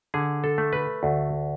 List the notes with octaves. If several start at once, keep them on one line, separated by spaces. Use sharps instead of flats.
D3 G#4
A4
A3
B4
D2